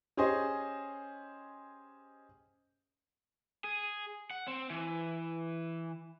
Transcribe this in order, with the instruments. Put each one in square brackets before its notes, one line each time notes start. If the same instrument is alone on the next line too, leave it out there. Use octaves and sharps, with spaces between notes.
[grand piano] C#4 G4 G#4 C5 D#5
[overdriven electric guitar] G#4
F#5
C4
E3